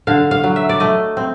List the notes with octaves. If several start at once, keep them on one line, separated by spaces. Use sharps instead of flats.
D3 F5
F5
F#3
E5
D5
A3 D#5
C4